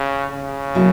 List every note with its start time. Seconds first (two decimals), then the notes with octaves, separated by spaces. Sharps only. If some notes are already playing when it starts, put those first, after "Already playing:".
Already playing: C#3
0.31 C#3
0.75 B2 F#3 A#3 E4